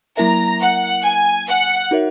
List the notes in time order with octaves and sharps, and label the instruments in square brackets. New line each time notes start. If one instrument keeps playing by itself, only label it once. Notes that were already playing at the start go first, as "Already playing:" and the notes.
[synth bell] F#3 A#3 E4 A#4 E5 [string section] A#5
[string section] F#5
G#5
F#5
[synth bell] D#4 F#4 A#4 C#5 E5